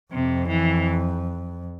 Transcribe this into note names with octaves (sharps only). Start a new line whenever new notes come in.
F2 C3
E3